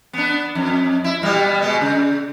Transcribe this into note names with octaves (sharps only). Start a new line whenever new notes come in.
B3 D4
F2
E4
B2 G3 B3
B2 G#3 B3
C#3